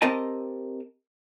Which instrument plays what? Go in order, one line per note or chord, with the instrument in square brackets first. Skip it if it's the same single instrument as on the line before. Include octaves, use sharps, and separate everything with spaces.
[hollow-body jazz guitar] C4 G4 A#4 D#5 A5